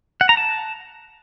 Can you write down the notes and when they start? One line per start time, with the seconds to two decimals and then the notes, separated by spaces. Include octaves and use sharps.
0.21 F#5
0.29 A#5
0.37 A5